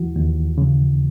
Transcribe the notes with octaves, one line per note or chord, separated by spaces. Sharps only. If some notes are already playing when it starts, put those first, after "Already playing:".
Already playing: D#2 E3 F#4
D#2
C#3